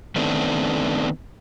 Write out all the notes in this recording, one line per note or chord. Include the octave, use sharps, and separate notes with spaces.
D#3 A3 B3 C4 D4